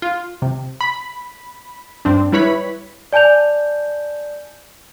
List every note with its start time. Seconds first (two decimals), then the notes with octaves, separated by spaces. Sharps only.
0.02 F4
0.42 C3
0.81 B5
2.05 G2 C4 D4
2.32 G3 E4 B4 C#5 B5
3.13 D5 G#5 A5 G6 F7